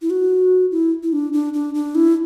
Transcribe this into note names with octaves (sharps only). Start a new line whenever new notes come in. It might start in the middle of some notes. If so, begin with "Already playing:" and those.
E4
F#4
E4
E4
D4
D4
D4
D4
E4